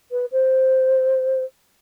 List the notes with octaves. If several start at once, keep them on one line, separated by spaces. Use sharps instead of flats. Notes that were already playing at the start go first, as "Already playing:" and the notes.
B4
C5